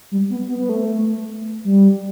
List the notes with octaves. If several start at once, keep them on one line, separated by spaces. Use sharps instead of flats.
G3
B3
B3
B3
A3
G3